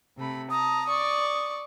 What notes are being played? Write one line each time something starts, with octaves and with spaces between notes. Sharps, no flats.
C3 A3 B5
A5 A#5 D#6
D5 C#6